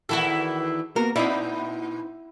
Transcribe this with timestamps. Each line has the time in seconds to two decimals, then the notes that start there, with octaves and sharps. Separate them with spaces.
0.09 E2 D#3 E3 E4 F#4 A4
0.96 A#3 B3 F#4 A#4
1.16 A#2 C4 D#4 E4 B4 D5